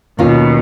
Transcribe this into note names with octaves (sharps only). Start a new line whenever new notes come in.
D#2 B2 D#3 A#3 C#4 F4